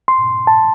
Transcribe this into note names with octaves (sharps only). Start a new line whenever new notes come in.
C6
A5